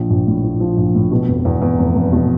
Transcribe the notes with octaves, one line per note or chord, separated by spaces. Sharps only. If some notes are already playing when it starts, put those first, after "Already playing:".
Already playing: A#1 F3
A#1
A2
F3
F3
A#1
A2
B2
F1
E2
E2
F1
F1
B2